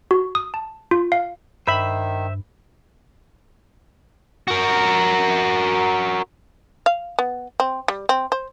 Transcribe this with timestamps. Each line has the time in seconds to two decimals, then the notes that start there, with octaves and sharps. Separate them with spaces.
0.11 F#4
0.35 D#6
0.54 A5
0.91 F4
1.12 F5
1.68 G2 D#3 C5 E5 B5
4.48 F#4 A#4
6.86 F5
7.19 B3
7.60 C4
7.88 G3
8.09 C4
8.32 C5